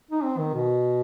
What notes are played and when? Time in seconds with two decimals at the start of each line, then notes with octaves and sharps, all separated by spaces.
0.11 D#4
0.23 C4
0.38 D#3
0.54 B2